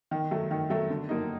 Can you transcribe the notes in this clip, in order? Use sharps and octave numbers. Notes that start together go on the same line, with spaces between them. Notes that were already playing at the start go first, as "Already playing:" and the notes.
D#3
F#3 A3
D#3
F#3 A3
D3
F#3 A#3 D#4